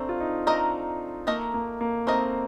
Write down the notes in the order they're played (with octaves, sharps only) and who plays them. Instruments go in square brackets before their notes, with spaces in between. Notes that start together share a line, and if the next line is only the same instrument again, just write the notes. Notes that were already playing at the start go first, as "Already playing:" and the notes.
Already playing: [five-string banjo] A3 A#4 [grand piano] C4 D4
[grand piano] F4
D#4
[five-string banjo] A3 D#4 A#4 D#5 [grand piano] D4
[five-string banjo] A3 D#4 A#4 D#5 [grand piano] A#3
[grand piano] A#3
A#3
[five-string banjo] A3 D#4 A#4 D#5 [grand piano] C4